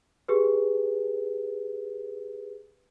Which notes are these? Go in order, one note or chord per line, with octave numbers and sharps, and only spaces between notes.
G4 G#4 B4